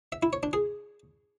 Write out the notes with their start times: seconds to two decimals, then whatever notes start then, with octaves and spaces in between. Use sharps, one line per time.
0.12 E5
0.23 E4
0.33 C#5
0.43 D4
0.53 G#4